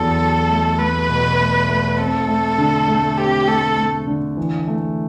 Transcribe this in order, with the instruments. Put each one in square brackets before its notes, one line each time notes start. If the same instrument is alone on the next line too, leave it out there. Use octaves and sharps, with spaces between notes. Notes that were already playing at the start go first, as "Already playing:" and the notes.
Already playing: [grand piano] E2 F#3 [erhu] A4
[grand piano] F#3
A3
[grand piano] A3 [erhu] B4
[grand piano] B2
A3
A3
[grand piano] C4 [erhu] A4
[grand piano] A3
D3
A3
[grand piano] C4 [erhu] G4
[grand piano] A3 [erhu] A4
[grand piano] A3
D3
E3
A3